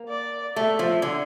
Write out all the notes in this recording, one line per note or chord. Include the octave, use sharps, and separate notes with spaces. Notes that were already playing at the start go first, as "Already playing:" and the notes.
Already playing: A#3
D5
A3 E5
F3
D3